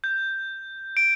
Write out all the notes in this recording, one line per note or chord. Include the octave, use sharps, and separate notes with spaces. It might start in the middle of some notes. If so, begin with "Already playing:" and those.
G6
D7